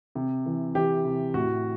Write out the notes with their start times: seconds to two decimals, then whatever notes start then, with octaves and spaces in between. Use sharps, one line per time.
0.15 C3
0.46 E3
0.75 E3 G4
1.05 C3
1.34 A2 F#4